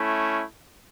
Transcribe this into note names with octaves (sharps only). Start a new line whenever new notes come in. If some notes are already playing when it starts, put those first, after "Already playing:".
Already playing: A3 C#4 E4